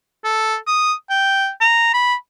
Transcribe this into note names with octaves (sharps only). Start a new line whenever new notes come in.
A4
D#6
G5
A#5
B5